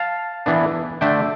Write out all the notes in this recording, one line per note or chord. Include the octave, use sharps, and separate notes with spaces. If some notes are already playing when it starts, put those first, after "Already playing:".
Already playing: F5 A5
E3 B3 D4
D3 A3 D4 E5 G5